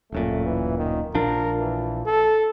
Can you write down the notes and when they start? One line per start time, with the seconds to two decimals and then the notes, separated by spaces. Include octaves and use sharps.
0.12 D1 F#2 A#2 A3
0.45 E3
0.77 D#3
1.14 A#1 F3 D4 A#4
1.60 E3
2.06 A4